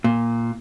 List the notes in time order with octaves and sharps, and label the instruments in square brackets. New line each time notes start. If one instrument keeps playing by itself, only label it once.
[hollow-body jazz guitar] A#2